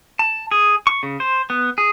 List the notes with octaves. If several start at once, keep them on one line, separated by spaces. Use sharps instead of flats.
A5
G#4
C#6
C#3
C5
B3
G#4